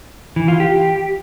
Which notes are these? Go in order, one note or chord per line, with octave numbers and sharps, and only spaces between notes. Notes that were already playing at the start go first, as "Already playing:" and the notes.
E3
F4
G4